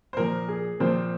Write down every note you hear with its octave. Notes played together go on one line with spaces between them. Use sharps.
C5
A#2 F3 A#4
G#4
A#2 F3 C4 C5